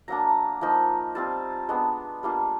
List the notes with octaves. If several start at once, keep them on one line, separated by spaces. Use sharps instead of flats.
F#3 A#3 D4 A#5
F3 A#3 D#4
G3 C4 F4 A5
G#3 B3 D4
G3 A#3 D4 F4